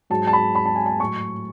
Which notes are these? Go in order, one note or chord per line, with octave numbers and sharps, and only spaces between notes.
G#2 F#3 A5
A5
B5
B5
A5
G#5
A5
A2 F#3 C#6